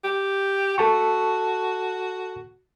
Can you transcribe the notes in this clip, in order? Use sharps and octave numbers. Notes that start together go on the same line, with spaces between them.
G4
F#4 A4 A5 C#6